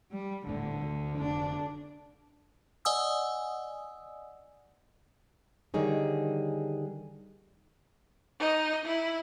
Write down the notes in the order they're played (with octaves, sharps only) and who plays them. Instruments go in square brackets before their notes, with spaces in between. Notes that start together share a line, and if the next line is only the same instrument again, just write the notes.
[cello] G3
[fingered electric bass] D#1 A2 A3 [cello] D3
[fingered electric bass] D2
[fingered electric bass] F1 D3 [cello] D4
[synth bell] D5 D#5 F#5 G#5 D#6 E6
[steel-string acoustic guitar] D3 D#3 G3 D#4 G#4 C#5
[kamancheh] D#4 D#5
E4